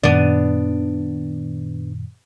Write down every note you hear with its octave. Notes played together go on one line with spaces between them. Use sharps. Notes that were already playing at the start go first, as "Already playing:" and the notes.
F#2 A#2 D#3 B3 D4